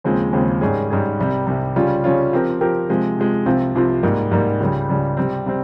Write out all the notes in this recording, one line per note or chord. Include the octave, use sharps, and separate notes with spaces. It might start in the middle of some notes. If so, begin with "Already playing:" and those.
D#2 C#3 F3 G#3 C4
D#2 C#3 F3 G#3 C4
G#2 G3 C#4 G#4
G#2 G3 C#4 G#4
C2 C3 G3
C2 C3 G3
C#3 G3 C#4 F4
C#3 G3 C#4 F4
F3 C4 G4 A#4
F3 C4 G4 A#4
C3 F3 G#3
C3 F3 G#3
C2 C3 F3 C4 F4
C2 C3 F3 C4 F4
G#2 G3 A#3
G#2 G3 A#3
C#2 C#3 G3
C#2 C#3 G3
C3 G3 C4
C3 G3 C4